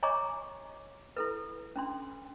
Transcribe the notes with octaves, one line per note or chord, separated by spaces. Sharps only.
C#5 D#5 G#5 A#5 C#6 D6
E4 A4 B4
C#4 D4 C6